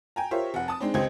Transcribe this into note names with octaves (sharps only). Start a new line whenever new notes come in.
G5 G#5 A#5
F4 G4 A#4 C5 C#5 E5
F1 F#5
A5 D#6
G#3 C4 D4 D#4
C#2 C4 G4 C5 D#5 G#6